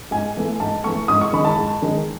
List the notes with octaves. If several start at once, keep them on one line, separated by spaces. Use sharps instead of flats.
G#2 G#5
E3 A3
G#2 A5
E3 A3 C#6
G#2 D#6
C#6
D#3 G#3 B5
A5
G#2
D#3 G#3